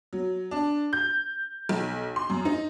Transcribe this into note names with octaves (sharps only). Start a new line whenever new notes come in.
F#3
D4
G6
B1
C6
F#2
D#4